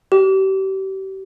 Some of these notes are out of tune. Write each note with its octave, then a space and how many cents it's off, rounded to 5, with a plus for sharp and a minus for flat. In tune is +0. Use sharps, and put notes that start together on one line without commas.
G4 -35